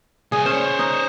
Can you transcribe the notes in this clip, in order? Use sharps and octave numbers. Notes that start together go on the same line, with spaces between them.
C2 G#4 G#5
C#4 C5 C#5
D#4